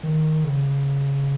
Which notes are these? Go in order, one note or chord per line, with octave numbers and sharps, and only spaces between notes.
D#3
C#3